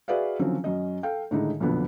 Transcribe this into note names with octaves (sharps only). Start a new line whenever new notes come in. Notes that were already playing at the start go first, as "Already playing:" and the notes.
F#4 G#4 B4 D5 E5 F5
D3 D#3 F3 F#3 C4 C#4
F#2 C#4 D#5
A4 F5 G5
A2 D3 D#3 G#3 D#4
B1 F2 A#2 D3 B3